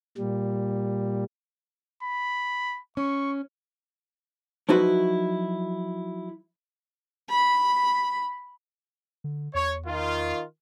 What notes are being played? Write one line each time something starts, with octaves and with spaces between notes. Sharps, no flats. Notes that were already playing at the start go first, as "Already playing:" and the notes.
A#2 G3
B5
C#4 C#6
F3 F#3 D#4 E4 F#4 B4
B5
D3
E2 C#5
D#3 F4